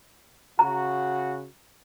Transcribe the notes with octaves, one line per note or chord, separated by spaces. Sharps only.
C#3 F#4 A#5